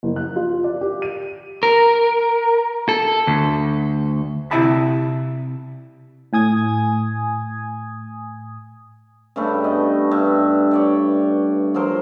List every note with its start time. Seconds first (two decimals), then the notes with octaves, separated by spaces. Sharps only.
0.03 F#1
0.16 F#6
0.36 F4
0.64 D5
0.81 G4
1.02 D#7
1.63 A#4
2.89 A4
3.27 D2
4.51 C3 E4 E5 A5 B5
6.33 A2 G#5 D#6 G#6
9.36 G2 C#3 A3 B5
9.64 B3 D#5
10.11 G2 E5
10.71 C#5 D5 G5
11.74 F3 F#3 A#4 C5